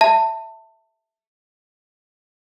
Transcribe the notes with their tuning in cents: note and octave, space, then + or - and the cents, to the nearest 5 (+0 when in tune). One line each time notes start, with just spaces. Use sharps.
E5 -5 A5 +25